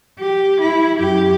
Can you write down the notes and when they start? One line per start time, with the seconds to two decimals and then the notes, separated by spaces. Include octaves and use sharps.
0.19 G4
0.61 E4
0.99 F#2 G4